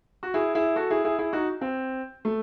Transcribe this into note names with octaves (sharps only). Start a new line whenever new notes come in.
F#4
E4 G#4
E4 G#4
F#4 A4
E4 G#4
E4 G#4
E4 G#4
D#4 F#4
C4
A3